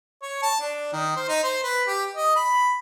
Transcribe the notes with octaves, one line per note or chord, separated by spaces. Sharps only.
C#5
A5
D4
D#3
C5
D#4
C5
B4
G4
D#5
B5